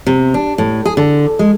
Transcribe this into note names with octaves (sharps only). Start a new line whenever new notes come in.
C3
D4
A2
G#4
D3
G#3